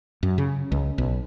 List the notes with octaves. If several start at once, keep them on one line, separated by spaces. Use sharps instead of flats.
F#2
C#3
C#2
B1